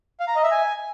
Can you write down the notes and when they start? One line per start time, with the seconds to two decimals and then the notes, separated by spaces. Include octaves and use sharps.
0.20 F5
0.28 A#5
0.36 D#5
0.43 E5
0.51 G#5